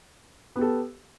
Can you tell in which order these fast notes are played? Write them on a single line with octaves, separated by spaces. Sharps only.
B3 G4 A4